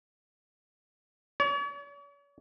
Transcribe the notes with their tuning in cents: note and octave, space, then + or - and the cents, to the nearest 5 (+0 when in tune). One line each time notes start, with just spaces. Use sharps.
C#5 +45